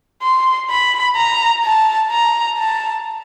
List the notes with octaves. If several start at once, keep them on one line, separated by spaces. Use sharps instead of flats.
C6
B5
A#5
A5
A#5
A5